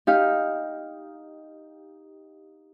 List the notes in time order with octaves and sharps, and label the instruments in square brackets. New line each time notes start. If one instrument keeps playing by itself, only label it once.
[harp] D#4 G4 F5